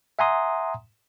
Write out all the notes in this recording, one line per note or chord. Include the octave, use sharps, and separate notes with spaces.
E5 F#5 G#5 A#5 C6 D#6